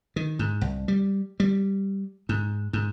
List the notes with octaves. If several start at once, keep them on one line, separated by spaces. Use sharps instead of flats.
D#3
G#2
C2
G3
G3
G#2
G#2